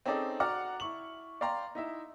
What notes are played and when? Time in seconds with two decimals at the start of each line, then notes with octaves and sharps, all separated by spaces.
0.06 C4 C#4 D#4 G#4 A4 D5
0.40 F#4 D5 F#5 A#5 D6 F6
0.80 E4 C#6 F#7
1.41 D5 F5 G5 A#5 C6
1.75 D#4 E4 E5